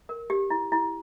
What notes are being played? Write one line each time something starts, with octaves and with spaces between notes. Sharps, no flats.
A#4
G4
E4
E4